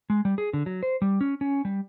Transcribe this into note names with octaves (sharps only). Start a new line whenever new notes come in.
G#3
G3
G#4
D3
F#3
C5
G3
C#4
C#4
G3